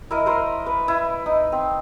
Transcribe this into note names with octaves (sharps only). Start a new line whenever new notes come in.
E4 A#4 D#5
A#4 C5 C6
B4
E4
D#4
C4